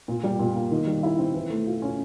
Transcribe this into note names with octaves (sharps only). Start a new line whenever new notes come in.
A#2
G3
A#2
A#3
D#3
G3
E4
C4
E3
A3
F4
C#4